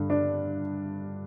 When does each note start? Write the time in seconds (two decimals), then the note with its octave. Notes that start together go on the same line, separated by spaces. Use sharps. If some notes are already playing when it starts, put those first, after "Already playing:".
Already playing: G2 D3
0.10 D4